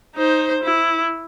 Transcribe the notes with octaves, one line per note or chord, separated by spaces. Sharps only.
D#4 C5
E4